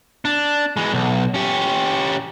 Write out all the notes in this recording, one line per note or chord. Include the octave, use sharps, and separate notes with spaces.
D4
E3 G#3
B1
C#4 G4